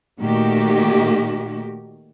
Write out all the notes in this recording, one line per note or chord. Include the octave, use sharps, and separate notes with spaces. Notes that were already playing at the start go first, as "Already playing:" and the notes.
A#2 D#3 A3 F#4 G4